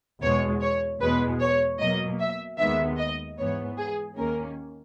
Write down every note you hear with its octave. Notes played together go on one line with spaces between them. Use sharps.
E2 B2 G#3 C#5
C#5
E2 B2 G#3 B4
C#5
B2 F#3 A#3 D#5
E5
D#2 D#3 G#3 B3 E5
D#5
G#2 E3 B3 C#5
G#4
D#2 D#3 A#3 C#4 A#4